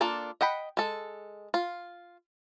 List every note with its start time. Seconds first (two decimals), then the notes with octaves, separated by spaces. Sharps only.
0.01 A#3 D4 F4 A4
0.41 D#5 F#5 G5 B5
0.77 G#3 A4
1.54 F4